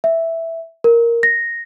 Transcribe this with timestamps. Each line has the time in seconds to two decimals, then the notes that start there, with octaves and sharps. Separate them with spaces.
0.04 E5
0.84 A#4
1.23 A#6